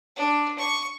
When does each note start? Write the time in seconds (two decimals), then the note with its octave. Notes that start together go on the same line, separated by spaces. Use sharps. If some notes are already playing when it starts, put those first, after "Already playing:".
0.17 D4
0.58 C#6